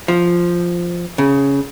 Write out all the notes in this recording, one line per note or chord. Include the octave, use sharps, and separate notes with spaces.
F3
C#3